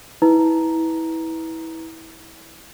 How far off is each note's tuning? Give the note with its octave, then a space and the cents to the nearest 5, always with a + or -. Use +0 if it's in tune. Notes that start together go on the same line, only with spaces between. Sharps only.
E4 -25 B4 +0 A#5 +0